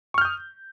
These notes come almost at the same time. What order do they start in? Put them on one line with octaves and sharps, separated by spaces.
C#6 F6 G6 D#6